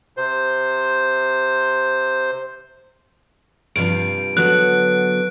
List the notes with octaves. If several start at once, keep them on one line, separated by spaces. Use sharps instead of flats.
C3 C5
G2 C3 F3 D7
D3 F#3 B3 F#6